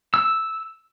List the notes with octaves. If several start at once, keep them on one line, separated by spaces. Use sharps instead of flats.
E6